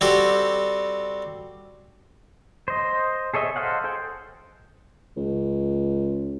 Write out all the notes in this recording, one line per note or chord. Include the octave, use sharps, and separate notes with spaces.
G3 C4 F#4 G4 A4
C5 D#5
G#4 A4 C#5 D#5 E5
A4 C5 D#5 F5 F#5
G#4 A4 C5 G5
C#2